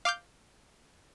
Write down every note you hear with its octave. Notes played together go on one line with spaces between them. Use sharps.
F5 D6 F6 G6